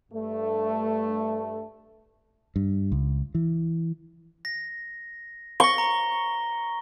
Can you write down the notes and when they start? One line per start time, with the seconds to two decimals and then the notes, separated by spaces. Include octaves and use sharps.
0.12 G2 A3
2.56 G2
2.92 C#2
3.35 E3
4.45 A#6
5.60 C#6 A#6 G7
5.78 A#5